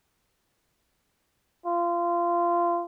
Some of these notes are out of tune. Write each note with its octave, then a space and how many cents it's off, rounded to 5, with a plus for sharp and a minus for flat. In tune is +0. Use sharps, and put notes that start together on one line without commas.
F4 -20